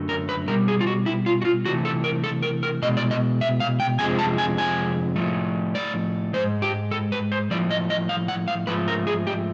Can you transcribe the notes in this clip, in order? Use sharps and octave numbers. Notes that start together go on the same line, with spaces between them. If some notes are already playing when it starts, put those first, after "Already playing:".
Already playing: F#2 D3 F#3 A3
A#4
B4
B2 G3 A#4
G#4
F4
F#4
E4
F4
F#4
F4
C3 E3 A3 F#4
A4
A#4
A4
A#4
A#4
B2 G#3 D#5
D5
D#5
E5
F5
G5
F2 C3 F3 G#3 G#5
A5
G#5
G#5
A2 F3 A3
D5
G#2 E3 G#3 C5
G4
A4
B4
C5
A2 F3 A3 D5
D#5
D#5
F5
F#5
F5
G#2 F3 A3 B4
A#4
G#4
G4